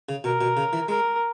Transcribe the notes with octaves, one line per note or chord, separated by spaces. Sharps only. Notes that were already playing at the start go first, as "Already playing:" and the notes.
C#3
B2 A#4
B2
C#3
E3
G#3 A#4